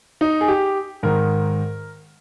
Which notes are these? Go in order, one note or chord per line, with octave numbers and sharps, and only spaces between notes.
D#4
G#4
G4
G#2 D#3 A#4